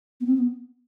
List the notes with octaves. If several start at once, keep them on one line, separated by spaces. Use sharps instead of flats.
B3
C4
B3